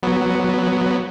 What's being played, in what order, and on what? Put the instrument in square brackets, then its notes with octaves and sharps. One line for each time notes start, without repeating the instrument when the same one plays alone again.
[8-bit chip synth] F#3 B3